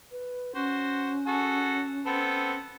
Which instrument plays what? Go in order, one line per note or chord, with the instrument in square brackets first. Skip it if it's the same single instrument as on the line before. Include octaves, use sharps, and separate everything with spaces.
[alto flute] B4
[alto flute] C#4 [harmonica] F#4 C5
[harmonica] F#4 G#4 A4
B3 C4 A4